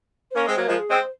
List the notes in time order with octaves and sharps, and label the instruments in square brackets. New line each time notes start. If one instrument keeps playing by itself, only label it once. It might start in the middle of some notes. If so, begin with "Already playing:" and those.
[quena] C5
[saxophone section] A#3 C#4 [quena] A#4
[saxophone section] G#3 C4
[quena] C5
[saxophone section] F#3 A#3
[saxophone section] F3 G#3 [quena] A#4
[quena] G#4
[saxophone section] G#3 C4
[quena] C5